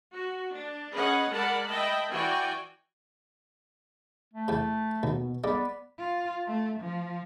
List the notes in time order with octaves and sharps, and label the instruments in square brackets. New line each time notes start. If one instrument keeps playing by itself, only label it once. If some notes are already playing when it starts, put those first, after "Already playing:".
[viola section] F#4
D4
C#4 G#4 B4 D#5 F#5
G#3 A#4 D5 F#5 A5 B5
D#5 E5 G5 A5 B5
E3 F#4 D5 G5 G#5
[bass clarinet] A3
[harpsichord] E2 C3
[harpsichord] D#2 [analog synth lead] B2
[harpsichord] G2 G#3 [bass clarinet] B3 [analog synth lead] D5
[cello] F4
A3
F3